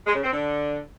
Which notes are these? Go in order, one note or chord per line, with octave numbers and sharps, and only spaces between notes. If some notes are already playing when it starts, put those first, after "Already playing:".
G#3
C#3
C4
D3